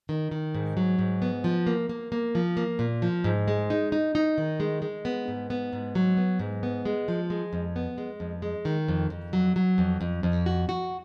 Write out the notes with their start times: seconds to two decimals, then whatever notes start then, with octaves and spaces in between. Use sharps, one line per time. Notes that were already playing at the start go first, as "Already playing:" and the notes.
0.09 D#3
0.31 D#3
0.55 G#2
0.77 F#3
0.99 G#2
1.22 B3
1.44 F3
1.67 A#3
1.89 A#3
2.12 A#3
2.35 F3
2.57 A#3
2.79 A#2
3.02 F3
3.24 G#2
3.48 G#3
3.70 D#4
3.92 D#4
4.15 D#4
4.38 D#3
4.60 G#3
4.82 G#3
5.05 B3
5.28 G#2
5.50 B3
5.73 G#2
5.95 F#3
6.17 B3
6.39 G#2
6.63 B3
6.85 G#3
7.08 F3
7.30 G#3
7.53 F2
7.76 B3
7.98 G#3
8.20 F2
8.42 G#3
8.65 D#3
8.88 F2
9.10 F2
9.33 F#3
9.56 F#3
9.78 F2
10.01 F2
10.23 F2
10.46 F#4
10.69 F#4